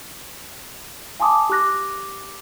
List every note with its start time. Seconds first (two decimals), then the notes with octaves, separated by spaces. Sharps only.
1.20 F5 G#5 A5 C6 D6 D#6
1.49 G4 D6 F#6 A#6